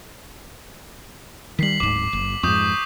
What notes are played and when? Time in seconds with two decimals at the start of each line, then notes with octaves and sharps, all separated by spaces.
1.59 D#3 G3 B6 C7 F#7
1.80 D1 G#2 D6
2.13 F#1
2.43 F2 G#2 C#6 D#6 G6